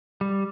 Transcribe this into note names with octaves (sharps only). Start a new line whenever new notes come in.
G3